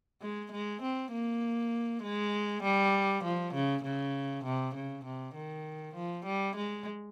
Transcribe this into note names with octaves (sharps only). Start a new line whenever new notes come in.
G#3
G#3
C4
A#3
G#3
G3
F3
C#3
C#3
C3
C#3
C3
D#3
F3
G3
G#3